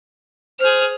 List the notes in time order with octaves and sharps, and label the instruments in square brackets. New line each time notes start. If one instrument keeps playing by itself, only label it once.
[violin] G#4 F6 [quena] C5